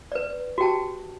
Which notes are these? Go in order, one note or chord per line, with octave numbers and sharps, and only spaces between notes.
B4 D5
F#4 G4 G5 A5